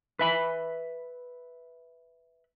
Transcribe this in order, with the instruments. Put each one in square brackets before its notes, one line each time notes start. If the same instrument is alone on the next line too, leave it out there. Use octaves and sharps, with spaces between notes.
[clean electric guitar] B4 E5 B5